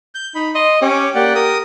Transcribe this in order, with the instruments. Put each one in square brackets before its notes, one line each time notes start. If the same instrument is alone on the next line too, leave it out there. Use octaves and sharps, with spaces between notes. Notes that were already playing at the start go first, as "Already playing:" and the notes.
[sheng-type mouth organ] G6
[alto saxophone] D#4 [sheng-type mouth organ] B5
[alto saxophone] D#5 [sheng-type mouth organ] C6
[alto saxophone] C#4 [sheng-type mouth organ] G4 C#5 D6
[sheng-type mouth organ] A#3 D5 F#5 [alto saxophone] G4
[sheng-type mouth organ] A#4 D#6